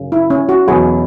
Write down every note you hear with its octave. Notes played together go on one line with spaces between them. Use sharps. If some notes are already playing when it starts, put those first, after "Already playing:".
Already playing: F#2 C#3
E4
C#4
F#4
E2 B2 F#3 E4 G#4